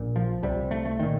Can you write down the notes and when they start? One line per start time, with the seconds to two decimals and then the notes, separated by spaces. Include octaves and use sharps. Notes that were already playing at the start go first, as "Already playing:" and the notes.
Already playing: A#1 A#2
0.16 F3
0.43 C2 C3 G3
0.71 A3
0.85 A3
0.99 A#2 D#3